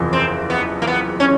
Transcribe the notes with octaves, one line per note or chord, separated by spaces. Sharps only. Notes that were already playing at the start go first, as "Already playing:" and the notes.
Already playing: F#1 E2 C3 F3
C4
B3
A#3
B3
C#4